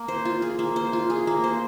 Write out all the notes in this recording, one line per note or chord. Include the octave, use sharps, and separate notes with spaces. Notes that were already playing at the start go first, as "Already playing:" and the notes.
Already playing: A#3
C5
F4
G#4
A#3
C5
F4
G#4
A#3
C5